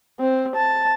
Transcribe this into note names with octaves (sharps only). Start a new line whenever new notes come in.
C4
A5